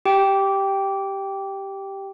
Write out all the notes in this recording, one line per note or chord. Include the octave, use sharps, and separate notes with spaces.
G4 G5